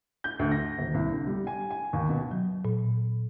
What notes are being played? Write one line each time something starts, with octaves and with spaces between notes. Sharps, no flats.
G6
D2
A#6
D#1
C2
D3
G3
G#5
G#5
D#2
B2
F#3
A#2